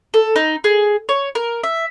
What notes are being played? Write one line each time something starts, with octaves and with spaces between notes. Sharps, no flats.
A4
D#4
G#4
C#5
A#4
E5